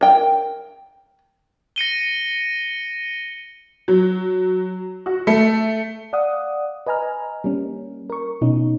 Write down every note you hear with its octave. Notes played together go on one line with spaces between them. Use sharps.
A#4 G5
A#6 C#7 D#7 G7
F#3
F#4
A3
D5 F5 F#5 D#6
B4 D#5 G#5 A#5 F6
G3 A#3 C#4
A#4 C#6
B2 C#4 D#4